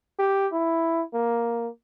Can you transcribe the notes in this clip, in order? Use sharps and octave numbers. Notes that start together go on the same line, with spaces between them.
G4
E4
A#3